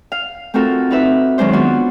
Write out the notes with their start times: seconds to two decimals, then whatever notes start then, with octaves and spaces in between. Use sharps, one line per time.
0.12 F5
0.54 A3 C4 F4 F#4 A4 A#4
0.91 D#4 B4 E5
1.38 D#3 F#3 G#3 D4 C5
1.53 B3 D4 F4 F#4